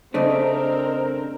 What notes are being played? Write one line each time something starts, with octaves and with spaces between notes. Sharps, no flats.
C#3 A3 C4 D4 A#4 C5 D#5